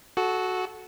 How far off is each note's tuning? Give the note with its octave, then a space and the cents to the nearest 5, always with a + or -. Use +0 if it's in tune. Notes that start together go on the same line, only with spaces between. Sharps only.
F#4 +0 A4 -20